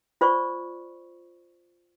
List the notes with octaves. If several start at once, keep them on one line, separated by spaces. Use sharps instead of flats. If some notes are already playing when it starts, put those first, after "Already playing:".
F4 C5 D5 C#6